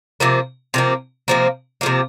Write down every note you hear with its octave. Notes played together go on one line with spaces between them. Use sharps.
C3 F3 A#3
C3 F3 A#3
C3 F3 A#3
C3 F3 A#3